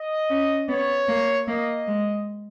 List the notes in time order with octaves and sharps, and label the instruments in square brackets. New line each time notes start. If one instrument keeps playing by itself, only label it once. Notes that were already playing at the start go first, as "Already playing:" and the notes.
Already playing: [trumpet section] D#5
[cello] C#4
[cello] B3 [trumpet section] C#5
[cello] A#3
[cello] A#3 [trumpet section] D#5
[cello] G#3